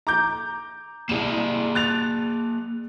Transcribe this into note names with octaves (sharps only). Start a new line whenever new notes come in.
A#5 D6 G6
C2 A#3 G#4 E7
F#6 A6 F7